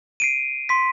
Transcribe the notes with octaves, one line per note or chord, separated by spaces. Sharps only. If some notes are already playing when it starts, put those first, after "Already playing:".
C7 D7 D#7
C6 B6